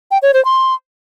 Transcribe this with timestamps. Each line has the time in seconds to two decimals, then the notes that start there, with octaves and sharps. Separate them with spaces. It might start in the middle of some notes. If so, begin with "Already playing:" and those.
0.11 G5
0.22 C#5
0.34 C5
0.45 C6